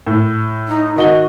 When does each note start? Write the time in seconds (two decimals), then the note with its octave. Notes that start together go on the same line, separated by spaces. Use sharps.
0.07 A2
0.68 D#4
0.96 D#3 F#4 D#5 G7